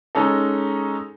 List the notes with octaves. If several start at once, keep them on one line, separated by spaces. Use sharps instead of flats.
G#3 C#4 D#4 A4